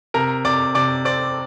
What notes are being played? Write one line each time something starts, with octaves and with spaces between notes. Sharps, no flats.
C3 A#4 A#5
C3 D5 D6
C3 D5 D6
C4 D5 D6